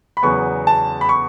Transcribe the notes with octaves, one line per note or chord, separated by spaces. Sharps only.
B5
E2 C#3 F#3 B3 C#6
A5
B5
C#6